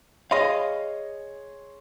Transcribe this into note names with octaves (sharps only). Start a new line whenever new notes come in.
G#4 C#5 D#5 F5 C6